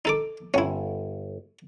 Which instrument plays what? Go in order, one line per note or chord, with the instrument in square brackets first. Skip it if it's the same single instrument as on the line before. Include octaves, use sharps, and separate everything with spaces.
[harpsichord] D#4 A4 D6
[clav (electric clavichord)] G1 [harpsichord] C#4 E4